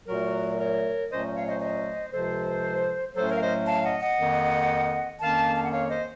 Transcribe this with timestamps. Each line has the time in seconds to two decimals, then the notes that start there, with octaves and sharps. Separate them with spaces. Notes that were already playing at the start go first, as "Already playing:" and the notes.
0.07 A#2 F#3 A3 F#4 A#4
0.59 A#4 C#5
1.10 A#2 F#3 A3 C#4 C5 D#5
1.36 C#5 F5
1.48 C5 D#5
1.61 C5 D#5
2.12 C#2 C3 F3 A4 C5
3.15 A2 F#3 A3 C#4 A4 C5
3.28 A#4 C#5
3.36 F5
3.42 C5 D#5
3.66 F5 A5
3.83 D#5 F#5
4.01 D#5 F#5
4.18 F2 D#3 A#3
5.20 F2 D#3 A#3 C#4 F5 A5
5.56 A5
5.64 F#5
5.72 C#5 F5
5.90 C5 D#5